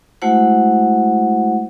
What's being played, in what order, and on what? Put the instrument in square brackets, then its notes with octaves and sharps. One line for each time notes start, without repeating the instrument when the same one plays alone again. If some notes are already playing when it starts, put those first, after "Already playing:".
[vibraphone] G#3 A3 E4 F#4 C5 F#5